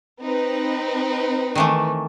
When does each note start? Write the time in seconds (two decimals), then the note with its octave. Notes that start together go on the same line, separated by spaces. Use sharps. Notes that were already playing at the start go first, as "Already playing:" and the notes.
0.22 C4 D#4 B4
1.55 D#3 E3 A3